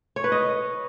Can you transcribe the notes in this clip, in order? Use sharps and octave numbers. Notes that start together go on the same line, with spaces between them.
C#5
B4
D#5